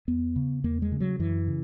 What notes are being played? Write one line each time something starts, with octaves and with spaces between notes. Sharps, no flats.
E2 B3
C#3
E2 A#3
G#3
C#3
F#3
F#2 E3
C#3